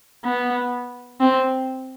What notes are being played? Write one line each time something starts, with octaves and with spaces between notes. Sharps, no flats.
B3
C4